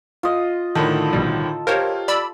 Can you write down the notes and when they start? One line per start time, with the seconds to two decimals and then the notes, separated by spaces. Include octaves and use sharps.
0.23 F4 D#5
0.75 A2 D3 D#3 A4
1.13 A#1 B2 G3
1.67 F4 G4 A#4 C5 C#5
2.08 D5 B5 E6